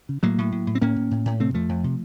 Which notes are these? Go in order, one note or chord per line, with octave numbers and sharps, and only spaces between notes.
C#3
A2 F#3 A#3
A2
A2
A2
C4
A2 A#3 C#4
A2
A2
A2
C3 A3 C4
F2 F3 A3
F2
C3